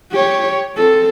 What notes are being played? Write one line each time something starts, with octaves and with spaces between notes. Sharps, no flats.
G4 C#5
C4 A4